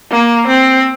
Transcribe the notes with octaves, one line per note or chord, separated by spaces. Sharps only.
A#3
C4